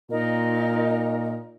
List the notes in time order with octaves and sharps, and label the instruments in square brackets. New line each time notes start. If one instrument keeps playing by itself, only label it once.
[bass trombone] A#2 [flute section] D#4 A#4 D#5